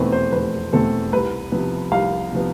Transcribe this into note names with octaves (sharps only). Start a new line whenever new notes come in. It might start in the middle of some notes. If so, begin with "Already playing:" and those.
Already playing: F1 E2 B2 A3 C4 B4 C5
C5
F1 B4
E2 B2 A3 C4 A4
C2 B4
C3 F3 B3
C2 F5
C3 F3 B3